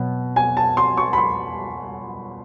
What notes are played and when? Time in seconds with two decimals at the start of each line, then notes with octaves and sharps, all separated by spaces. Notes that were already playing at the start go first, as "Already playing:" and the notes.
Already playing: B2 F#3 B3
0.36 G#5
0.57 A5
0.77 C6
0.97 C#6
1.13 B5
1.18 C6